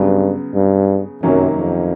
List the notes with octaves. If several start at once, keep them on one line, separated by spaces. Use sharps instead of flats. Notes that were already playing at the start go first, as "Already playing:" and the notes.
Already playing: G2 C#3 F#3 B3
G2
F#2 C3 D#3 F#3 A#3 C#4
F2